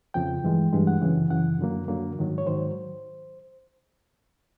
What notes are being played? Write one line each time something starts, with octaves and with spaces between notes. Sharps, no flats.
F2 C#3 F3 G5
G2 E3 G#3
G2 E3 G#3
F#5
F#2 C#3 E3
F#2 C#3 E3 F#5
F#2 D3 F#3 A#3
F#2 D3 F#3 A#3
G#2 D#3 F#3
C#5
G#2 D#3 F#3 C5